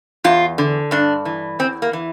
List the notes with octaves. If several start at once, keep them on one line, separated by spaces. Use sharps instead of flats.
E2 F4
D3
G2 D4
E3
E2 C4
A#3
E3